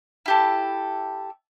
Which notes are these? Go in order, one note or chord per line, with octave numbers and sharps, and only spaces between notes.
E4 G4 A4